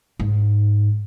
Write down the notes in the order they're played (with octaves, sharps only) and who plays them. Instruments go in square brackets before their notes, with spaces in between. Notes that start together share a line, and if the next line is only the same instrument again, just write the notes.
[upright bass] G#2